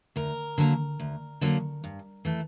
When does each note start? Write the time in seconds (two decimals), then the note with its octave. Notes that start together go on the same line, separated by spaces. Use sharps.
0.16 D2 A#4
0.58 D3 F#3 A#3
1.00 D2
1.41 D3 F#3 A#3
1.84 G2
2.25 E3 A3